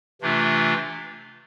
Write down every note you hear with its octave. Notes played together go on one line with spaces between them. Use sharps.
C3 E3 A3 D4 F4